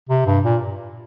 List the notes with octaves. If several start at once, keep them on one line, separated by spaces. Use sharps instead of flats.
C3
G2
A#2